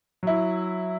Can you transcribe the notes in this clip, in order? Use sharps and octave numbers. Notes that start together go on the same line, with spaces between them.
F#3 E4